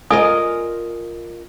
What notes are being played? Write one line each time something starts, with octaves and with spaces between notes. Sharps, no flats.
F4 A#4 D5 D#5 G#5 D#6